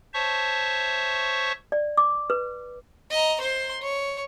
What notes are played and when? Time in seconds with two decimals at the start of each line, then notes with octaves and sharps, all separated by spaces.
0.14 C5 C#5 E5 A5 C#6
1.72 D5
1.97 D6
2.30 B4
3.11 D#5 A#5
3.41 C5 C6
3.82 C#5